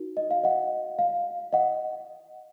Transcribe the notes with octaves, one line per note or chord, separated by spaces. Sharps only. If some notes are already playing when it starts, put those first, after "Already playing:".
Already playing: D#4 F#4 A#4
D#5
F5
D#5 F#5
F5
D#5 F#5